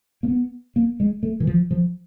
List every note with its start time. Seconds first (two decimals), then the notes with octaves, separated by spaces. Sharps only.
0.23 A#3
0.28 B3
0.76 A#3
1.00 G#3
1.23 A3
1.40 E3
1.47 F3
1.71 F3